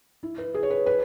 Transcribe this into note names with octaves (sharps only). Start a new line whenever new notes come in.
E4
B4
G#4
C#5
B4
B4